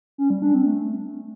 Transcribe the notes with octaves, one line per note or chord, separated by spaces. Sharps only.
C#4
G3
D4
C4
A3